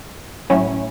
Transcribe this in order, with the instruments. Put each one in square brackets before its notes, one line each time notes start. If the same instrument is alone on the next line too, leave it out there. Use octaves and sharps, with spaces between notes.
[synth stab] A2 F#3 C#4 E4